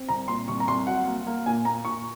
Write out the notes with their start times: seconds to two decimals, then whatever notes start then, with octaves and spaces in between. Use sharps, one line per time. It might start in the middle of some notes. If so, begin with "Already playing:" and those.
Already playing: C4
0.09 C2 A#5
0.28 A#2 C6
0.48 C2 C#6
0.60 A#5
0.68 C2 C6
0.87 F#3 F#5
1.07 A#3
1.27 A#3
1.46 A#2 G#5
1.65 A#3 A#5
1.85 A#2 C#6